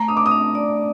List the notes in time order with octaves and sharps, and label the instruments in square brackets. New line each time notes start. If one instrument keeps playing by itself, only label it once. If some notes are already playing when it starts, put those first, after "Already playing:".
Already playing: [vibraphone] A3 [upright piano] A#5
[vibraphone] D4 [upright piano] D#6
[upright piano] D6
D#6
[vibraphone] D4
D5